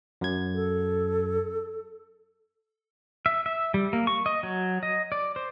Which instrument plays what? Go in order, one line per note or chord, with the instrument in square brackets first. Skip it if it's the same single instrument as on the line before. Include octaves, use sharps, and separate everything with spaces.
[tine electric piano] F#2 F#3 G#6
[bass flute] A4
[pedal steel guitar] E5
E5
G3
A#3
C#6
D#5
F#3
D#5
D5
C5